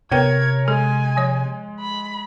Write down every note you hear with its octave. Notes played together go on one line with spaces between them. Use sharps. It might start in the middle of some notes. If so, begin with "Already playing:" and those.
C3 B3 A#4 B4 C#5 G5 G#6
G#3 A4 G#5
F3 C#5
B5